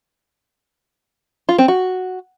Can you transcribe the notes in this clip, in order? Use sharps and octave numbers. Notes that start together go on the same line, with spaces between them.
F4
C4
F#4